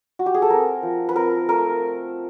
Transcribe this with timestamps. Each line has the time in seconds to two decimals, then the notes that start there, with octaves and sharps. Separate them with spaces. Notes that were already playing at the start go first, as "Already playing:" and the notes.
0.19 F#4
0.26 G4
0.34 G#4
0.42 A4
0.50 C4 A#4
0.83 F3
1.09 B4
1.15 C4 A#4
1.49 A3 A#4